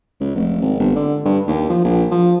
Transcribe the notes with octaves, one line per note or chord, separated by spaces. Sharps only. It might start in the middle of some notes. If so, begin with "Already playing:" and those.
C#2
F1
G#1
G1
D3
G2
D#2
F3
A#1
F3